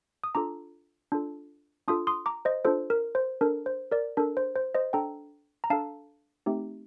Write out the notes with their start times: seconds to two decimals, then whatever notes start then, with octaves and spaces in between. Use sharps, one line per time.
0.24 D#6
0.35 D4 F4 A4 A#5 D6
1.12 D4 F4 A4
1.88 D4 F4 A4 C6 D#6
2.07 C6 D#6
2.26 A#5 D6
2.45 C5 D#5
2.65 D4 F4 A4 C5
2.90 A#4
3.15 C5
3.41 D4 A4 A#4
3.66 C5
3.92 A#4 D5
4.17 D4 A4 A#4
4.37 C5
4.56 C5
4.75 C5 D#5
4.93 D4 A4 G5 A#5
5.64 A#5
5.70 D4 A4 F5 A5
6.46 A3 C4 D#4 G4